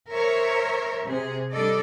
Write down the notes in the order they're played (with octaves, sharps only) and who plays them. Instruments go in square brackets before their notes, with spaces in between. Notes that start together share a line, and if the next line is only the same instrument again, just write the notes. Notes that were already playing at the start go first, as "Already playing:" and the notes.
[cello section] A#4 C5 C#5 E5
C3 G#4
G3 D4 A4 D5 D#5